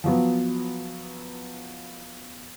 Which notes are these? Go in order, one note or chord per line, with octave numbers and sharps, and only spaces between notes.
F3 F#3 B3